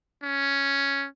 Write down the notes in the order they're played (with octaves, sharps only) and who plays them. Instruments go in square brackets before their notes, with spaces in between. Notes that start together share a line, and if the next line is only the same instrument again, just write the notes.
[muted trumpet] C#4